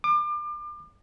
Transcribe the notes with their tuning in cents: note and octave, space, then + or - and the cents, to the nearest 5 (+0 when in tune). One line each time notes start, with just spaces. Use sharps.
D6 +35